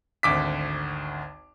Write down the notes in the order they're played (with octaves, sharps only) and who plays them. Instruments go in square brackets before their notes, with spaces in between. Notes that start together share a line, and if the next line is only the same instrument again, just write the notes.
[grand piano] G#1 D2 D6 B6